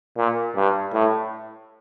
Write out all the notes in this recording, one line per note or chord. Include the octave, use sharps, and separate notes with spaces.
A#2
G2
A2